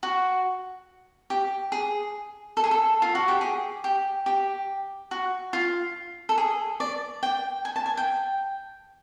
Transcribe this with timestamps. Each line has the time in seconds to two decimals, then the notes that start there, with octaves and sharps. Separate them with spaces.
0.03 F#4
1.30 G4
1.72 G#4
2.57 A4
2.64 G#4
2.71 A4
3.02 F4
3.15 F#4
3.28 G4
3.41 G#4
3.84 G4
4.26 G4
5.11 F#4
5.53 F4
6.29 A4
6.38 G#4
6.80 D5
7.23 G5
7.65 G#5
7.76 A5
7.86 G#5
7.97 G5